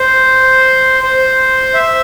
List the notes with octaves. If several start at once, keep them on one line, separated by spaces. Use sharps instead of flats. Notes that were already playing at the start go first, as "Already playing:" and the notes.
Already playing: C5
C5
E5